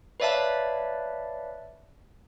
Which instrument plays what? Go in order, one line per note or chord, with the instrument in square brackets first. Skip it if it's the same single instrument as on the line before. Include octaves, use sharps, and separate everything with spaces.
[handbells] B4 C#5 D5 E5 F5 A5